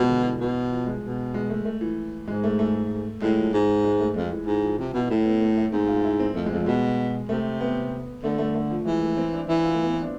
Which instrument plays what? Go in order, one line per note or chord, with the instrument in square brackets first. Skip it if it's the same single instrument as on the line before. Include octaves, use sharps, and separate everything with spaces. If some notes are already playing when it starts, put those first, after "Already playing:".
Already playing: [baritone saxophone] B2 [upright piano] F3 G#3
[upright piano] D3
F3
E3
[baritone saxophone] B2
[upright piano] F3
G#3
[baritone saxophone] B2
[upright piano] G#3
A3
A3
E3
[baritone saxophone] G#2 [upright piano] G#3
[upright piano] A3
A3
[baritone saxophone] A2 [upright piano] G#3
[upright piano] F3
[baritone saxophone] G#2
[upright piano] G#3
A3
[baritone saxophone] F2 [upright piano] G#3
[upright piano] E3
[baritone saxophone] G#2 [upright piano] E3
[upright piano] F3
[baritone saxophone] C3 [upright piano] F3
[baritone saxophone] B2 [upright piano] E4
[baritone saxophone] A2 [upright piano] E4
[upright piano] B3
A3
A3
[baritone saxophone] G#2 [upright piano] C4
[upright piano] F4
E4
C4
[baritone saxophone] F2 [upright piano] A3
[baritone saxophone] F2 [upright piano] G#3
[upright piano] F3
[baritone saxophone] B2 [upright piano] G#3
[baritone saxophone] C3 [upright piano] A3
[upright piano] B3
[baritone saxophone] D3 [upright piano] A3
[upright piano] A3
A3
F3
F3
[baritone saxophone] E3 [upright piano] G#3
[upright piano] A3
C4
D4
[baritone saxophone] E3 [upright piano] E4
[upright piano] F4
A3
B3
C4
D4